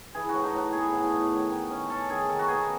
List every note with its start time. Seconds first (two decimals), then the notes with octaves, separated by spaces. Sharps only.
0.14 E3 G#4
0.29 A2 F#4
0.43 D#4
0.53 A2 F#4
0.73 B3 G#4
0.92 A2
1.12 A2
1.31 D#3
1.50 D#3
1.70 C#4
1.90 C#4 A4
2.09 D#3 G#4
2.29 D#3 A4
2.39 F#4
2.48 B2 G#4